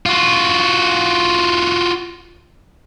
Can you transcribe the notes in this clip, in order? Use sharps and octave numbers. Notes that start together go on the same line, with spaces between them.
F4 F#4